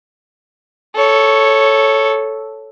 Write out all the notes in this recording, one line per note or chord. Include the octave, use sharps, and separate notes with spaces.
A4 C#5